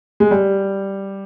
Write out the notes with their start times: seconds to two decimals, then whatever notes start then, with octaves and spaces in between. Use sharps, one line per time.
0.20 G#3
0.31 G3